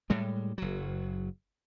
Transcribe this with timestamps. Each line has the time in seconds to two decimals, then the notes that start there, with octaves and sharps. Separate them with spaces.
0.10 A2 G3 G#3
0.58 F#1 F#3